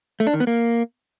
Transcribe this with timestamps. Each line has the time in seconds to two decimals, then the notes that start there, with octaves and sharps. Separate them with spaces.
0.20 A3
0.27 D4
0.34 D#3
0.40 B3
0.47 A#3